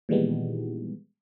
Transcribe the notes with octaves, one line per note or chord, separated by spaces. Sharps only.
A#2 D#3 E3 G3 G#3 B3